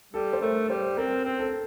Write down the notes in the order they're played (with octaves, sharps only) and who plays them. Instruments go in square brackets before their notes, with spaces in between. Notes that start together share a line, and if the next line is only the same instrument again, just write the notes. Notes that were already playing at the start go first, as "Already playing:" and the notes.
[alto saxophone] G3 [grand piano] A4
[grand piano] C5
[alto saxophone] A3 [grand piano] A#4
[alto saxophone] G3 [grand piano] C5
[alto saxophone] C4 [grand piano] A#4
[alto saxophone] C4
[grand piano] A4